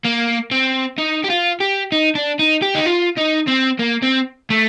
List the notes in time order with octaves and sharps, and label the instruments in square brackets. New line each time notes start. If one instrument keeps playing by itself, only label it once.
[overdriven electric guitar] A#3
C4
D#4
G4
F4
G4
D#4
D4
D#4
G4
D#4
F4
D#4
C4
A#3
C4
A3